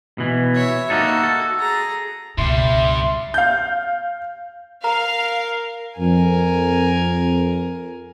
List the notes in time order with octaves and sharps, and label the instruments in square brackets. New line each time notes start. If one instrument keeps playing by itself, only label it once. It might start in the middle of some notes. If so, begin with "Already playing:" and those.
[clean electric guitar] B2 E3
[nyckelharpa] C#5 E5
[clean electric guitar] A#3 D#4 A4 [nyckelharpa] F#4
[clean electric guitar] A4
[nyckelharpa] G#4 A#5
[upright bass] C#2 B2 [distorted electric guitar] G2 G3 [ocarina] E5 [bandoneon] C6
[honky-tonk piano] F5 G6
[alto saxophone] A#4 [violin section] F5 [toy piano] A#5
[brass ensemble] F2 [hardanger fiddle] A#4 G#5